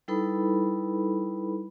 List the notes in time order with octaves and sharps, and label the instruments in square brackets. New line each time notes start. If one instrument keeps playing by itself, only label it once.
[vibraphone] G3 D#4 E4 A4 B4 B5